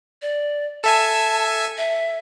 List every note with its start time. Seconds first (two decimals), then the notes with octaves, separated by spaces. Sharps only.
0.22 D5
0.84 A4 E5 G#5 A5
1.78 E5